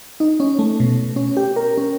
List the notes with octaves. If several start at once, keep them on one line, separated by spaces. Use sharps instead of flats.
D#4
C#4
A3
B2
C#4
G4
A#4
C#4